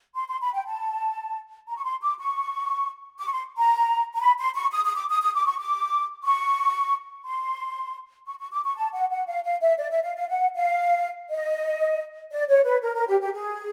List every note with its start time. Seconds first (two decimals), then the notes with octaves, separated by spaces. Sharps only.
0.15 C6
0.28 C6
0.41 B5
0.54 G5
0.66 A5
1.68 A#5
1.76 C#6
1.84 C6
2.01 D6
2.19 C#6
3.19 D6
3.26 C#6
3.32 C6
3.57 A#5
4.14 A#5
4.20 B5
4.38 C6
4.54 C#6
4.72 D#6
4.85 D#6
4.96 D6
5.09 D#6
5.22 D#6
5.34 D6
5.46 C#6
5.58 D6
6.23 C#6
7.25 C6
8.26 C#6
8.38 C#6
8.51 D6
8.64 C#6
8.76 A5
8.93 F#5
9.10 F#5
9.27 F5
9.44 F5
9.61 E5
9.78 D5
9.90 E5
10.03 F5
10.16 F5
10.28 F#5
10.55 F5
11.30 D#5
12.31 D5
12.48 C#5
12.65 B4
12.82 A#4
12.95 A#4
13.07 G4
13.20 G4
13.33 G#4